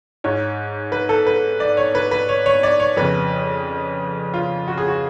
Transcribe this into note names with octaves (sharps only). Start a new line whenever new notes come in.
G#2 C#5
B4
A4
B4
D5
C#5
B4
B4
C#5
C#5
D5
C#5
F2 C#3 B4
F4
F#4
G#4
F#4